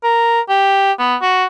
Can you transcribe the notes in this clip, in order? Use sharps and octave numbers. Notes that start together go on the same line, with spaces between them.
A#4
G4
B3
F#4